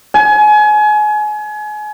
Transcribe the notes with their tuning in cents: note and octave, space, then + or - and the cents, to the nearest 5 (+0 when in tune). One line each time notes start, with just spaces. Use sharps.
G#5 +30